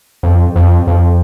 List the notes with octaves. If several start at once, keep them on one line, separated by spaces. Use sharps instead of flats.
F2
F2
F2